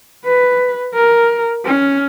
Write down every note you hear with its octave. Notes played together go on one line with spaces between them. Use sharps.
B4
A#4
C#4